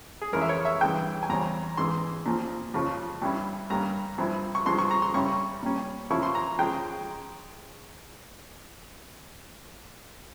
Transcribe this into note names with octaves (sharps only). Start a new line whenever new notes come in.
G#4
F2 E3 G#3 C#4 E4 A#4
E5
C#5
E5
G2 E3 G#3 G5
G#5
E2 C#3 G3 C4 A#5
G#2 E3 G#3 C6
A#2 F3 C4
F2 C#3 F3
G2 G3 C#4 E4
G2 G3 A#3 C#4 A#5
G2 F3 C4 E4
C#6
G2 F3 G#3 C4 C6
C#6
A#5
C6
C#3 G3 C#4 E4 C#6
A#2 G3 C#4
C#3 F3 A#3 E4 C#6
C6
A#5
F3 G#3 C#4 G5